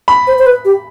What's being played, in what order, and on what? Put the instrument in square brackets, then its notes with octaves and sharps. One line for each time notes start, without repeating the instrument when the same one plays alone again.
[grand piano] B5
[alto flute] C5
C5
B4
G4